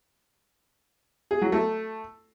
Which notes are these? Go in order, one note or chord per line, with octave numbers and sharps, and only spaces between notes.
G#4
F#3
A3